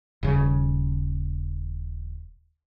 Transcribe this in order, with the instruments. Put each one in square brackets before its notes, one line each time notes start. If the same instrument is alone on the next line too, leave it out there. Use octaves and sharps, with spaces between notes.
[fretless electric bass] D#1 C#3